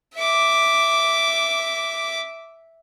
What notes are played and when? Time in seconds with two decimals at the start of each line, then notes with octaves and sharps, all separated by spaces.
0.15 E5 D6